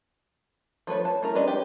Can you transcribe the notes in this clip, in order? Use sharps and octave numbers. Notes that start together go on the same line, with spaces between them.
F3 A3 B4 C#5
A5
A3 E4 A#4
G#3 C#4 D4 B4 D#5
G4